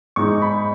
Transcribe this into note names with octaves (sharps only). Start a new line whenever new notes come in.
G#2 G#3 D#4 C#6
B5